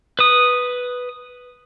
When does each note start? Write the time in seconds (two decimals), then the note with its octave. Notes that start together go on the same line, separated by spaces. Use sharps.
0.19 B4 D#6